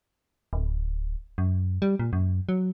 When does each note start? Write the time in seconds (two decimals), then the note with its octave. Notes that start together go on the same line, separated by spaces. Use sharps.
0.53 D1
1.38 F#2
1.82 G3
1.99 A#2
2.13 F#2
2.49 F#3